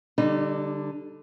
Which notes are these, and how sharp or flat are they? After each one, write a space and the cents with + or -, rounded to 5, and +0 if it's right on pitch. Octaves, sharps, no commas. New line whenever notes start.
D3 +0 G3 +5 D#4 -35